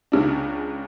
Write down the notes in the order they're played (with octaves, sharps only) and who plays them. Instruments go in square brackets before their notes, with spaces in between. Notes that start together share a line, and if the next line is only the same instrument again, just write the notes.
[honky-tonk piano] C#2 C#3 D4